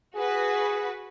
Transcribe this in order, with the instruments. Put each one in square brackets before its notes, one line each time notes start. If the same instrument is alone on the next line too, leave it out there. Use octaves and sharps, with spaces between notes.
[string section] F#4 B4 [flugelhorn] G#4